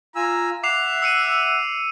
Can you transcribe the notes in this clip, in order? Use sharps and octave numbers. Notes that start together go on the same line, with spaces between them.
F4 G#5 A#5 E6
E5 F#5 D6 C7 F7
E6 C#7 D#7